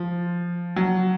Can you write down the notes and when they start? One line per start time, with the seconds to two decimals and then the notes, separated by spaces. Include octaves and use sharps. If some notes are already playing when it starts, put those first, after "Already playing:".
Already playing: F3
0.76 F#3